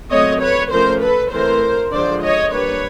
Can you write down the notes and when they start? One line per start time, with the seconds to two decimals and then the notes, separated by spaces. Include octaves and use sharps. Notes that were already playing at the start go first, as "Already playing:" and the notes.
0.11 F#3 A3 C4 C#5 D#5
0.41 B4 C#5
0.71 F3 A3 C#4 A#4 C5
1.02 A4 B4
1.32 E3 A3 C4 A#4 C5
1.92 D3 F3 G#3 C5 D5
2.23 C#5 D#5
2.53 G3 A#3 D4 B4 C#5